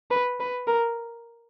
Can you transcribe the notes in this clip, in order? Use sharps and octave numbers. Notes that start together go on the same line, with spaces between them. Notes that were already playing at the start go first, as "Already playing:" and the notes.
B4
B4
A#4